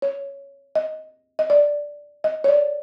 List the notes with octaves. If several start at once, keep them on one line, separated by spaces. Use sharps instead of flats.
C#5
D#5
D#5
D5
D#5
C#5
D5